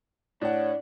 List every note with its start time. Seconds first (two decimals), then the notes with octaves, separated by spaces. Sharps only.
0.42 A2 D4 C#5 F#5